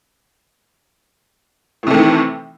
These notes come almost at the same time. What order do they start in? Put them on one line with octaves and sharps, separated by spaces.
A2 C3 A3 D#3 E3